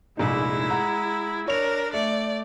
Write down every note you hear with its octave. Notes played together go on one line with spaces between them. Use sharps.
F1 A#1 G#3 D#4 E4
F#5 A#5
D4 A#4 C#5 F7
A3 D5